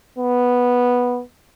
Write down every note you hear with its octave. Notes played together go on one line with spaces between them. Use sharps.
B3